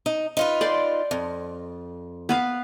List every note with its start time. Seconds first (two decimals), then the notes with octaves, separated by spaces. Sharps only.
0.06 D#4
0.37 D#4 F4 B4
0.61 D5 G5 C6
1.11 F2
2.29 B3 B4 F5